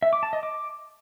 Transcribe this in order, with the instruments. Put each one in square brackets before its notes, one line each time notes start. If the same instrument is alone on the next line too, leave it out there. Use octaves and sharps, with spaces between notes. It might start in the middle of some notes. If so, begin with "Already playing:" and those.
[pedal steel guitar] E5
D6
A5
D#5
D6